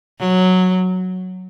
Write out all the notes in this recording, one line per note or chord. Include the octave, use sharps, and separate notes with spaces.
F#3